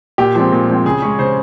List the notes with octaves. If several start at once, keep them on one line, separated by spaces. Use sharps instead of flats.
A#2 G4
F3 G#3 C4
A#2
F3 G#3 C4
C#3 G#4
G#3 C#4
C#3 C5